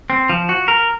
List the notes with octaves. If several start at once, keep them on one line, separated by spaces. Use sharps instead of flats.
C4
F3
F#4
A#4